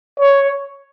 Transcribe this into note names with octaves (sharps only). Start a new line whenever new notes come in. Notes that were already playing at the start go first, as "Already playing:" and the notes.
C#5